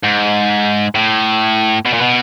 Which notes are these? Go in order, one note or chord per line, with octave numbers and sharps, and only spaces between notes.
G#2
A2
B2
A#2
B2